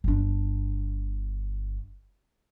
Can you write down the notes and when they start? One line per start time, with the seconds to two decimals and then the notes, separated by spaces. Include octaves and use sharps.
0.04 G1 D4